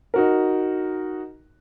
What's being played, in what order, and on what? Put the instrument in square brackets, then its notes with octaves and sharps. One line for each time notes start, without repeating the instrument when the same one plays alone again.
[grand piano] D#4 F#4 A#4